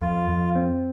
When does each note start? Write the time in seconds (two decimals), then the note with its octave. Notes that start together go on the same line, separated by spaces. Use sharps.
0.02 F2 F4
0.28 F2
0.55 C4